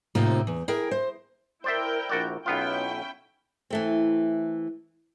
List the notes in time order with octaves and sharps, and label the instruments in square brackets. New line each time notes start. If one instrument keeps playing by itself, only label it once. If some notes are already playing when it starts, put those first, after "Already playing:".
[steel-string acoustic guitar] A2 C3 A#3 C4 D#4 F4
E2
E4 G#4 A#4 G5
C5
[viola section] E4 A#4 G5 [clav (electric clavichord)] C5 D5 E5
[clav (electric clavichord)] A#1 F#4 D5
[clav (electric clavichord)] B1 B3 F4 [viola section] C#4 E4 G5
[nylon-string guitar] E3 A3 C4